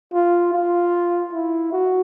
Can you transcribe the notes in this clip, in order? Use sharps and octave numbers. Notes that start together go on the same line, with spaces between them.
F4
F4
E4
F#4